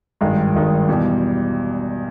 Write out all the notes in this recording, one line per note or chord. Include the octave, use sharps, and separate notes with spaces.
G#1 G2 D#3 G#3
G#1 G2 D#3 G#3
E2 B2 G3